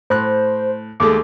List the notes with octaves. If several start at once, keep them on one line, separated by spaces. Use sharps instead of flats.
A2 C5 F#6
D#2 G#3 A3 D6